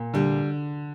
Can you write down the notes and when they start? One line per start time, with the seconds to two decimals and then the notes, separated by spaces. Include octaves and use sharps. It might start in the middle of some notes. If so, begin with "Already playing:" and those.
Already playing: A#2
0.14 D3 G3